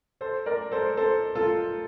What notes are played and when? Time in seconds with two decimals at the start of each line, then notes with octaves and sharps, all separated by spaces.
0.21 A4 C5
0.46 A#4 D5
0.72 A4 C5
0.97 A4 C5
1.35 F4 A4